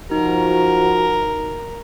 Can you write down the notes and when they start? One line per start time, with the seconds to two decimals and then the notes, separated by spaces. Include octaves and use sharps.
0.11 F3 D#4 F#4 A#4